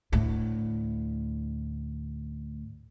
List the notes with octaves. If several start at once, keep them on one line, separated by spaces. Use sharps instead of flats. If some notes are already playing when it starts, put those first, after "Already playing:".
D2 A2